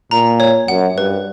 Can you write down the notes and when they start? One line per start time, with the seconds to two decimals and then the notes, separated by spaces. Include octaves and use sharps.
0.11 A#2 A#5
0.40 C#5
0.68 F#2 F#5
0.98 G2 B4